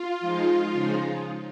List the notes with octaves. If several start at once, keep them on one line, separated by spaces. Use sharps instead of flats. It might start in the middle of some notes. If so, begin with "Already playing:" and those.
Already playing: F4
F3 G#3 D#4
C#3 F3 G#3 D#4